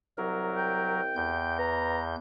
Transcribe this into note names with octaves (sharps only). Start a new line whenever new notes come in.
C2 F#3 A#4
G5
E2 G6
B3 A#5